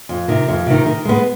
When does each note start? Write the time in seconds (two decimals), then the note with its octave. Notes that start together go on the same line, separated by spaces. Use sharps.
0.09 F2
0.28 C3 D#3
0.48 F2
0.66 C3 D#3
0.86 D#3
1.05 G#3 B3